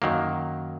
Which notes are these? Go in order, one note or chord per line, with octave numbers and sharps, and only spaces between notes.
F#2 D#3 F#3 A#3